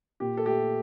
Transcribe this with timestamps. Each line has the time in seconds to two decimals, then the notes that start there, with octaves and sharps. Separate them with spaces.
0.20 A#2 G4
0.37 A4
0.45 A3 G4